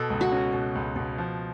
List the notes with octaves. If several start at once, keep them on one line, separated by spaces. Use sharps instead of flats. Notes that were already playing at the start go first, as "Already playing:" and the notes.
Already playing: B2 A4
C#2
F#4
C#4
B2
C#2
B2
F3